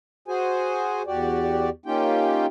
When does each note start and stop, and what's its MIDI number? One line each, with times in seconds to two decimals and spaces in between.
0.28 1.02 66
0.28 1.02 68
0.28 1.02 72
0.28 1.02 80
1.07 1.70 40
1.07 1.70 66
1.07 1.70 67
1.07 1.70 74
1.86 2.46 58
1.86 2.46 61
1.86 2.46 63
1.86 2.46 65
1.86 2.46 67
1.86 2.46 79